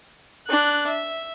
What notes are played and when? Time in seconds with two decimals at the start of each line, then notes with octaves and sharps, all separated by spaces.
0.47 D4 F#6
0.88 E5